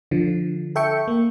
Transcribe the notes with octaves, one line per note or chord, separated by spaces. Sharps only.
D3 F3
A4 E5 G5 C#6 C#7
A#3